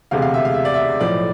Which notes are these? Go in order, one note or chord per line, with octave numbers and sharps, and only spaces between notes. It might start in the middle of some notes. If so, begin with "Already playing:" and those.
E1 D2 C3 G#3 F5
F5
E5
F5
E5
D5
E5
B1 A2 F3 D5